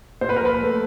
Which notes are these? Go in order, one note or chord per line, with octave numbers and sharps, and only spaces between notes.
A#2 C5
B4
A#4
F3 B4
A3